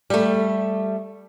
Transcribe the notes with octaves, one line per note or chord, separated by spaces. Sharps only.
G3 A3